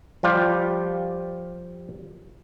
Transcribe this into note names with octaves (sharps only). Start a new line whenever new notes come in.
F3 G3 F4 G4